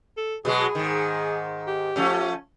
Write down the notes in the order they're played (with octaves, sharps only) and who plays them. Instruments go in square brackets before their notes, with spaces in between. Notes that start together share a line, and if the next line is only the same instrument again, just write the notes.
[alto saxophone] A4
[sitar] B2 F#3 G#3 [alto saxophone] G#4
[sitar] G#2 D#3
[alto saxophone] G4
[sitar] F3 A3 C#4